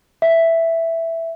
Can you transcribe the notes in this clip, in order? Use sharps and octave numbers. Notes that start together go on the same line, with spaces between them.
E5